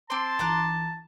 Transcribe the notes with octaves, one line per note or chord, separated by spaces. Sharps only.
C4 A5 C6 D6
G1 E3 A#5 D6 F#6